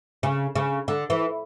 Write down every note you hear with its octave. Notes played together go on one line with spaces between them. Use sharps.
C#3
C#3
D3
E3